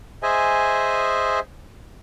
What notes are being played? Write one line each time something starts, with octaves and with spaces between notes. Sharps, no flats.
G#4 C5 D#5 E5 G#5